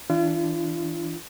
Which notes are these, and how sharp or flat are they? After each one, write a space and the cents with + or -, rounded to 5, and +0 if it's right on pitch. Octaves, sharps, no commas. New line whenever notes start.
E3 -25 D4 +5 F4 -40